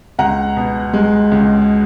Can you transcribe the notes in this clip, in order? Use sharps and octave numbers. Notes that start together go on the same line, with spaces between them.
C#2 F#5 A#5
B2
G#3
C#2